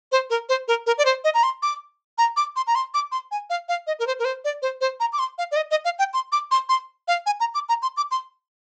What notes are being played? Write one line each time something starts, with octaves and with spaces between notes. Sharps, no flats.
C5
A#4
C5
A#4
A#4
D5
C5
D#5
A#5
C6
D6
A#5
D6
C6
A#5
C6
D6
C6
G#5
F5
F5
D#5
A#4
C5
A#4
C5
D5
C5
C5
A#5
D6
C6
F5
D5
D#5
D#5
F5
G5
C6
D6
C6
C6
F5
G#5
A#5
D6
A#5
C6
D6
C6